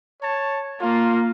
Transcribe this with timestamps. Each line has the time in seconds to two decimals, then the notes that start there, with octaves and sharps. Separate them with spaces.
0.22 C#5 A5
0.81 A#3 F4